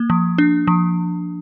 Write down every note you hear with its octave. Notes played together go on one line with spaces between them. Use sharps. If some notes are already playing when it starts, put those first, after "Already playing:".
Already playing: A#3
F3
D4
F3